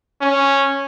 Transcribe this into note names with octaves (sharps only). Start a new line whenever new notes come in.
C#4